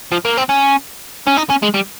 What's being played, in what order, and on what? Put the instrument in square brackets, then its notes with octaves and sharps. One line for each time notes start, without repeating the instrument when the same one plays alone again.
[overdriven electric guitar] F3
A#3
C4
C#4
C#4
D#4
C#4
G#3
G3